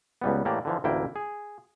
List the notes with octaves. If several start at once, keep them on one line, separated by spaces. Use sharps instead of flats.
C#2 G3 B3
A2 E3 A#3 G4 D5
D3 E3 F3
A1 D2 A#3 E4 G5
G#4